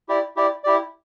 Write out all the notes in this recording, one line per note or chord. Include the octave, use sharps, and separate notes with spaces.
E4 G4 D5
E4 G4 D5
E4 G4 D5